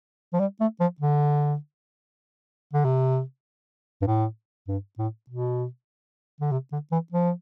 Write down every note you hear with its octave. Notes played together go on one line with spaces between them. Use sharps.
F3
G3
A3
F3
D3
D3
C3
G2
A2
G2
A2
B2
D3
C3
D3
E3
F3